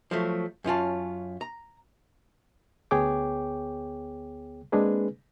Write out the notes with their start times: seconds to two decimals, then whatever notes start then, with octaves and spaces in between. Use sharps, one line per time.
0.11 F3 F#3 A3
0.64 F#2 C#4 F4 A5
1.41 A#5
2.91 D2 B3 G#4 C#5 G5 D6
4.72 G#3 A#3 C4 D4 G#4 B4